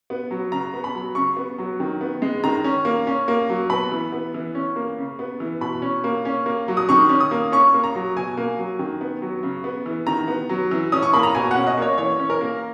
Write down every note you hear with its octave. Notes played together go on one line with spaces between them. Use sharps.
B3
F#3
C#3 A#5
B3
B5
F#3
C#3 C#6
B3
F#3
D#3
B3
G#3
D#3 A#5
C#4
A#3
C#4
A#3
F#3
B3 B5
E3
B3
E3
C#4
A#3
C#3
B3
E3
B2 B5
C#4
A#3
C#4
A#3
F#3
D#6
D#3 C#6
C#4
D#6
A#3
C#4 C#6
A#3
A#5
F#3
B2 G#5
A#3
F#3
D#3
B3
F#3
C#3
B3
E3
D#3 A#5
B3
F#3
E3
C#4 D#6
C#6
A#3 B5
A#5
B2 G#5
C#4 F#5
D#5
A#3 C#5
E3 C#5
C#4
A#4
A#3